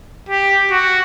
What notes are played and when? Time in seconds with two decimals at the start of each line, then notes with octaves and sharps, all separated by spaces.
0.29 G4
0.71 F#4